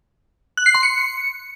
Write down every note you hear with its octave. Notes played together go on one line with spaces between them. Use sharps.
F#6
C7
C6
C#7